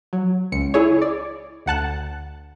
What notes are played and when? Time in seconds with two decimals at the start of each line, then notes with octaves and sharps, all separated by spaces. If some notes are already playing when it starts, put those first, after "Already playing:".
0.13 F#3
0.52 C#2 C#7
0.74 E4 G#4 C#5
1.02 D5
1.66 D2 F#5 A5 F#6